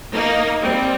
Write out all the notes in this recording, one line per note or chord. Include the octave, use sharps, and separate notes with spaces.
A#3 D#4
G3 C4